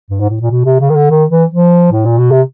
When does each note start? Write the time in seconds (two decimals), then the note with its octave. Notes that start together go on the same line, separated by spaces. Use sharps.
0.10 G2
0.20 G#2
0.30 A2
0.40 A#2
0.50 B2
0.65 C3
0.80 C#3
0.89 D#3
0.95 D3
1.10 D#3
1.30 E3
1.50 F3
1.92 A2
2.05 A#2
2.18 B2
2.31 C3